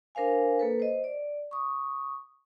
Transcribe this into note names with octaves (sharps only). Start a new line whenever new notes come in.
D4 A#4 C5 F5 G#5
A#3 A4 B4
C5 D#5
D5
C#6 D#6